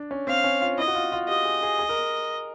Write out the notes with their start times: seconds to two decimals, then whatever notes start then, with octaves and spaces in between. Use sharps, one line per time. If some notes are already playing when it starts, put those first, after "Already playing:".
Already playing: D4
0.11 C#4
0.27 C4 F5
0.44 C#4
0.61 F4
0.78 E4 D#5
0.88 F#4
0.95 F4
1.12 F4
1.28 G4 D#5
1.45 G#4
1.63 G#4
1.79 G#4
1.89 A#4